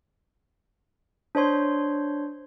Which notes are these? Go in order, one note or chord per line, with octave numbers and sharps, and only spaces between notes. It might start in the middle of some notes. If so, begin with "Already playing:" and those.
D4 C5 C#5 C6